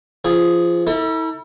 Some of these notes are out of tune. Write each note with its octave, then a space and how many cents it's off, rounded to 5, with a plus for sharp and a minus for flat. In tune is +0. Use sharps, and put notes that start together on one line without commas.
F3 -15 G#4 +0
E4 -40 A4 +30